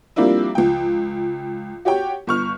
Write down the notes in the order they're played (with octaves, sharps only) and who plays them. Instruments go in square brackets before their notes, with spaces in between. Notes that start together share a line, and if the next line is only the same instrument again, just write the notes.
[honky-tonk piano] F3 G3 A#3 C4 D4 E4
C#2 F3 G5
F#4 G4 C#5 G5
G1 C#6 F6